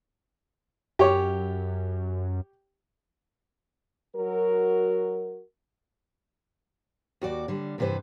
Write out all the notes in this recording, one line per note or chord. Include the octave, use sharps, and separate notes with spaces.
F#2 G4 C#5
F#3 F#4 A#4
D#2 F#4 D5
D3 G3
E2 G2 C3 E3 B4 C5